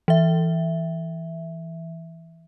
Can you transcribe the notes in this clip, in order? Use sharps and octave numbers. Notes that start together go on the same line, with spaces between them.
E3 E5